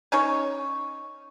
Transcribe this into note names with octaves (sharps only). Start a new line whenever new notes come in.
C#4 D#4 G#4 C#5